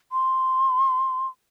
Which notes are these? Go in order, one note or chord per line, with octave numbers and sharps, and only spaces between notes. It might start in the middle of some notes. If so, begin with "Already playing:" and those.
C6